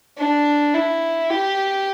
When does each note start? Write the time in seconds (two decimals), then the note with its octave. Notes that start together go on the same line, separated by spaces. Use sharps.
0.18 D4
0.74 E4
1.30 G4